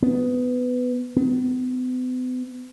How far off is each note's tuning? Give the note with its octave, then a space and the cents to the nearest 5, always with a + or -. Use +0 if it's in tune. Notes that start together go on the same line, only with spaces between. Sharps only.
B3 +15
B3 +45